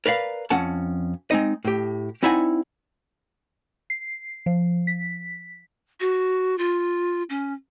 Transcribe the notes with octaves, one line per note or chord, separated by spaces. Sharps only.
A#4 B4 D5 F5
F2 C#4 F#5 A5
G#3 C4 D#4 D#5
A2 G4
C4 D#4 E4 D5 F#5 G#5
C7
F3
B6
F#4
F4
C#4